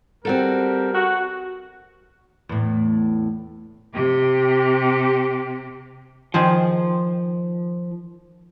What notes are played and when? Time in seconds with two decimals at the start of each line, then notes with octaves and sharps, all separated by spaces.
0.25 G3 C4 F#4 A4 A#4
0.94 F#4
2.49 E2 A2
3.94 C3 G4
6.34 D#3 F3 G#4 C5